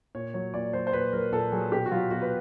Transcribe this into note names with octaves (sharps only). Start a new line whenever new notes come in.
A#2 C#5
F#3 C#5
A#2 D5
F#3 C5
C5
A#2 B4
F#3 A#4
A#2 A4
F#3 G#4
B2 G4
F#4
F#3 F4
B2 F#4
B4